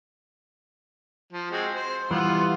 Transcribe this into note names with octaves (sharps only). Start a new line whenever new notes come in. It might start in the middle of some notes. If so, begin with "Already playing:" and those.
F3
G#3 C4 F#4
C5
E3 G3 B3 F4 F#5 C6